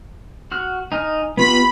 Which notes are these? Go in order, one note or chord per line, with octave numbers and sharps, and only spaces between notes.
F#4 F6 F#6
D#4 G#5 F6
B3 F4 G4 B5